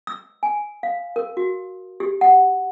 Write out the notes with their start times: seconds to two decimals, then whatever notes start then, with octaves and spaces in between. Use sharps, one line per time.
0.07 E6
0.43 G#5
0.83 F5
1.16 A#4
1.37 F#4
2.00 G4
2.21 F#5